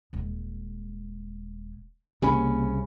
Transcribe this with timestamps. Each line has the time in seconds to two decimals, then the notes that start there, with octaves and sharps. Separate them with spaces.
0.13 D#1 G#3
2.22 C2 C#3 A#3 C#4 G4 G#5 B5